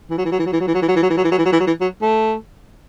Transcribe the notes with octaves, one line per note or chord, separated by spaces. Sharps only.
E3
F#3
E3
F#3
E3
F#3
E3
F#3
E3
F#3
E3
F#3
E3
F#3
E3
F#3
E3
F#3
E3
F#3
E3
F#3
E3
F#3
A3